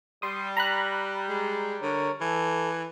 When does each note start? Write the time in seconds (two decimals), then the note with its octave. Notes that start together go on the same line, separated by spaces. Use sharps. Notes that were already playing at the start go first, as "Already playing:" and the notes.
0.22 G3 C6 D#6
0.57 A#5 B5 F#6
1.29 G#3
1.82 D3 A#4 C#5
2.21 E3 A4